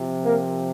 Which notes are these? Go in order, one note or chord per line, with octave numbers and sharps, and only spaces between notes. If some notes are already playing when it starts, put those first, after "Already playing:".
Already playing: C3 F3
A#3 A#4